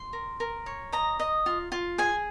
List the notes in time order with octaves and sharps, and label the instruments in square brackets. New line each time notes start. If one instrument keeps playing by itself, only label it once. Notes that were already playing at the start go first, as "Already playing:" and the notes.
Already playing: [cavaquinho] C6
A#4
A#4
C#5
D#5 A#5
D#5
F4
F4
G#4 G#5